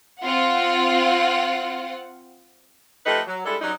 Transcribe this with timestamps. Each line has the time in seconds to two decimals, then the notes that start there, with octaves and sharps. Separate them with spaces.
0.20 C4 F4 F#5
3.06 F3 A3 D#4 G4 A4 B4
3.27 F#3
3.45 G3 G#3 D4 E4 A4
3.61 F#2 F#3 G3 D#4